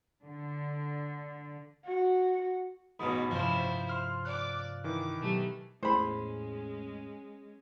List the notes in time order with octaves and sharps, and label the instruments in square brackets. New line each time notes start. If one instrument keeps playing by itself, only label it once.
[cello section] D3
[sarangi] F#4
[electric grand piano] A1 B5 [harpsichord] G#2 B2 [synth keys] D#6
[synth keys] G2 C3 [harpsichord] F3 [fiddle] E4 C5
[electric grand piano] C6 F6
[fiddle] D5 D6 [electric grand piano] F#6
[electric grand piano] D#3 E3 [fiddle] D6
[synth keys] B2 F#3 G4 [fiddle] A3
[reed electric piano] E2 G#4 [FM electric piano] A2 [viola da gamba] G#3 C#4 [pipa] C5 B5